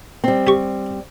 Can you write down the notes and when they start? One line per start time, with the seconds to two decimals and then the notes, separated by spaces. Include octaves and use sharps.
0.24 G3 C4
0.47 G4 C#6